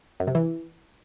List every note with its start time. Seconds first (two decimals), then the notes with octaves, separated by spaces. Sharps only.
0.20 F#2
0.27 C3
0.35 E3